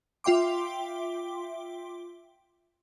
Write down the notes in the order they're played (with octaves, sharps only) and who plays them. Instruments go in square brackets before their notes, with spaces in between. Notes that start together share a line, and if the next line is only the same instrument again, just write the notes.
[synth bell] F4 E5 G5 C6 D6